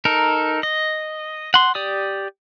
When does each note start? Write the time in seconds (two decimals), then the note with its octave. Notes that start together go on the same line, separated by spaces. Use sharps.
0.05 D#4 A4 A#4
0.63 D#5
1.54 F#5 C6
1.75 G4 D5 D#6